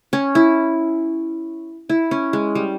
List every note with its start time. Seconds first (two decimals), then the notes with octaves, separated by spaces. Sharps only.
0.13 C#4
0.35 E4
1.89 E4
2.11 C#4
2.33 G#3
2.55 G3